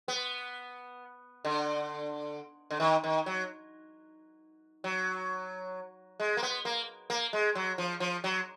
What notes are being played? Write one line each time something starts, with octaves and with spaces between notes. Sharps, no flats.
B3
D3
D3
D#3
D#3
F#3
F#3
G#3
A#3
B3
A#3
A#3
G#3
F#3
F3
F3
F#3